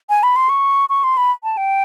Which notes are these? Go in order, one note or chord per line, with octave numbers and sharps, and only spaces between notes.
G#5
B5
C6
C#6
C#6
C6
B5
A5
G5